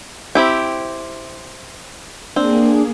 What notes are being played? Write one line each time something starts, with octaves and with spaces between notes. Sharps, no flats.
C4 E4 G4
A#3 C4 D4 G#4